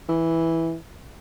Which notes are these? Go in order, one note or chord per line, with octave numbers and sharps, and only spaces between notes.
E3